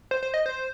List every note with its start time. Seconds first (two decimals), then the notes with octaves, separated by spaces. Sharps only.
0.11 C5
0.23 C5
0.34 D#5
0.46 C5